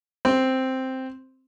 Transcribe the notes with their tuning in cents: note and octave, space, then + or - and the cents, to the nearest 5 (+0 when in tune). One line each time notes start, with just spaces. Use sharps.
C4 +0 C6 +0